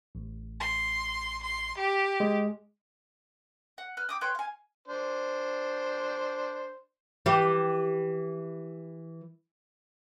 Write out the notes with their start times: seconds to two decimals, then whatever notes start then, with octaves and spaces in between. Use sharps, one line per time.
0.15 A1
0.60 C6
1.43 C6
1.78 G4
2.20 G#3
3.78 F#5
3.97 B4 F6
4.09 G5 D6 D#6
4.21 B4 C#5 G5 C6
4.35 F5 G#5
4.88 D4 C5
7.26 E3 G4